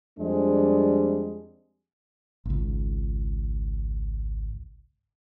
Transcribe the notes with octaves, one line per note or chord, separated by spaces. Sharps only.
F2 G3 G#3 C4 D4
G#1 C#2